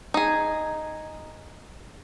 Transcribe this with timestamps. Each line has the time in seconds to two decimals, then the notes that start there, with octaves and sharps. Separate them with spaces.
0.14 D#4 G#4